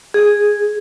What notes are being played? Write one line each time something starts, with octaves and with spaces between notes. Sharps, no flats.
G#4